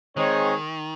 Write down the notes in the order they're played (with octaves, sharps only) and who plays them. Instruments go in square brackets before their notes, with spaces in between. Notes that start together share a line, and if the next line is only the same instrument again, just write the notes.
[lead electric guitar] D#3 [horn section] G#3 C4 D#4 G#4 C#5